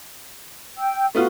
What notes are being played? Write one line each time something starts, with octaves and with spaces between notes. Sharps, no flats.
G5 E6
A3 B3 F4 F#4